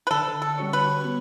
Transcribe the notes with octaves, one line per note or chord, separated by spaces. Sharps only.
B4
D3 A4
A4
G3 C#4 F#4 C#5
B4
B3